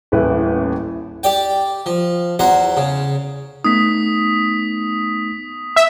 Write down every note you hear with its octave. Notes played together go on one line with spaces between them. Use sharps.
D#1 A1 A2 E4 B4
G4 D5 G5
F3
E2 F#4 C5 A#5
C#3
A3 B3 D#4 D#6 B6
E5